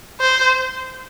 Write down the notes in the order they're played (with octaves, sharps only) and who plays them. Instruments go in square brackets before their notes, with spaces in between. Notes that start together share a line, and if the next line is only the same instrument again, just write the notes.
[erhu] C5